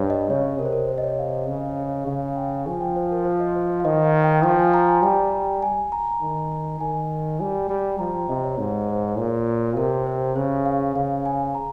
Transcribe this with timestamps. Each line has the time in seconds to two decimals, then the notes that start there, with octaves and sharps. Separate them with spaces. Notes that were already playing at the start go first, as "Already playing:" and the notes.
Already playing: G2 C#5
0.10 D#5
0.30 C#3 C#5
0.59 C3 A#4
0.65 C5
0.73 A#4
0.88 C5
0.98 D#5
1.03 C#5
1.19 F5
1.33 D#5
1.48 C#3 C#5
2.07 C#3 F5
2.36 G5
2.66 F3 G#5
2.81 G5
2.96 C5
3.11 A#4
3.25 C5
3.40 D#5
3.56 C5
3.70 C5
3.80 F5
3.85 D#3 D#5
4.05 F5
4.24 G5
4.43 F3 G5
4.59 G#5
4.74 A#5
4.88 G#5
5.03 G3 G5
5.63 G#5
5.92 A#5
6.21 D#3
6.80 D#3 G#5
7.40 G3 G#5
7.70 G3 G5
7.99 F3 A#5
8.14 G5
8.29 C3 D#5
8.44 C#5
8.58 G#2 C#5
8.89 C5
9.18 A#2 C#5
9.77 C3 A#4
10.06 C5
10.36 C#3 C5
10.66 F5
10.95 C#3 F5
11.26 G#5
11.55 A#5